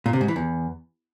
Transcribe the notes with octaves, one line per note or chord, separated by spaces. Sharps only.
A#2
C3
G#2
E3
E2